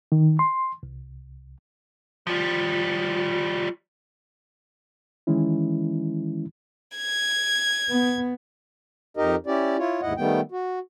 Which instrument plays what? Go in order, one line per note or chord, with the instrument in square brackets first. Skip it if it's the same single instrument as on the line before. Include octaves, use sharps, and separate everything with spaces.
[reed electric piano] D#3
C6
C2
[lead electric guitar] F3 G3 [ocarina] F4
[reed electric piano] D#3 E3 G#3 C#4 E4
[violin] G#6
[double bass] B3
[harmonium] F2 D#4 G4 A#4 D#5
C#4 E4 G4 D5
E4 F4 C#5
D#2 G#2 E4 D#5 F#5
D#3 G3 A3 B3 G5
F#4